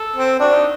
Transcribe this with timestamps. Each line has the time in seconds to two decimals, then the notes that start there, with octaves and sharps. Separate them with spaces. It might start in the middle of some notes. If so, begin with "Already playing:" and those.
Already playing: A4
0.16 C4
0.40 D4 F#4
0.54 D#4